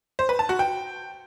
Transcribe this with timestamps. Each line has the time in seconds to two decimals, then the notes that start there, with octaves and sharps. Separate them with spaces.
0.19 C5
0.29 B4
0.39 A5
0.49 F#4
0.59 G5